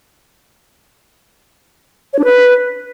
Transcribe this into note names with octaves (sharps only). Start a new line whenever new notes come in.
C#5
D4
B4